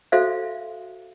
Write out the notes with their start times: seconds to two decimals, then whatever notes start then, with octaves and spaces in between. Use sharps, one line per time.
0.12 F#4 A4 C5 E5 F5